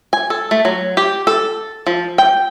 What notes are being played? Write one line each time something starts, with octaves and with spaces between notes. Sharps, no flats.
G#5
A4
A3
F#3
G4
A4
F3
G5